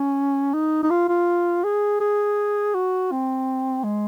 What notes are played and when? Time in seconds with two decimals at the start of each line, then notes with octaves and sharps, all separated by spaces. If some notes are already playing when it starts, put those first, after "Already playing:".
Already playing: C#4
0.54 D#4
0.83 D#4
0.90 F4
1.09 F4
1.64 G#4
2.00 G#4
2.74 F#4
3.11 C4
3.84 G#3